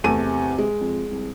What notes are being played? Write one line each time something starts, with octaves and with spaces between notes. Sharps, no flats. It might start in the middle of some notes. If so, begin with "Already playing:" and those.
E2 C3 A3 D#7
G#3
F2
C2